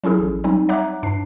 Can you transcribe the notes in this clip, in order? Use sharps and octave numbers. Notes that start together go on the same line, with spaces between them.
F#3 C#4 E4 G#4 A4
A1
F#3 G3 C4 D#4
C#5 E5 F#5 A#5 D6 F#6
G2 D4 C7